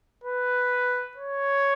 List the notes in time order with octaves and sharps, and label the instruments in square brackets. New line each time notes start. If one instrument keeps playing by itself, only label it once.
[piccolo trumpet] B4
C#5